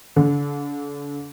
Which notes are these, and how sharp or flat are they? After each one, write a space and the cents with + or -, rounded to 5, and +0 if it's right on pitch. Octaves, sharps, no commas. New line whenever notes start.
D3 -45